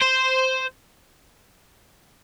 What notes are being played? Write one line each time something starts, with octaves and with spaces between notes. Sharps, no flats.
C5